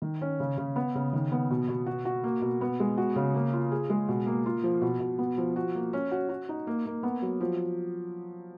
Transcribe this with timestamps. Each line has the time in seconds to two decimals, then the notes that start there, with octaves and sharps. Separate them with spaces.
0.02 D#3
0.21 C#4
0.40 C#3
0.58 C#3
0.76 B3
0.95 C#3
1.13 D#3
1.32 B3
1.51 B2
1.68 B2
1.86 F#4
2.05 F#4
2.24 A#3
2.42 B2
2.61 B3
2.80 G#3
2.98 F#4
3.16 C#3
3.34 A#3
3.53 F4
3.72 G#4
3.90 G#3
4.08 B2
4.27 A#3
4.46 F4
4.63 F3
4.82 B2
5.00 B2
5.19 B3
5.38 F3
5.56 F#4
5.75 A#3
5.93 C#4
6.11 F#4
6.29 F#4
6.49 D#4
6.67 A#3
6.86 A#3
7.03 B3
7.22 F#3
7.40 F3